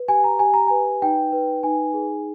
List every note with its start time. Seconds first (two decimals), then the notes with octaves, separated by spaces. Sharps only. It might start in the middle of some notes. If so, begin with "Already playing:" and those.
Already playing: B4
0.08 G4 G#5
0.24 A#5
0.39 G4 G#5
0.54 A#5
0.68 B4 G#5
1.02 D#4 G5
1.32 B4
1.63 D#4 G#5
1.94 G#4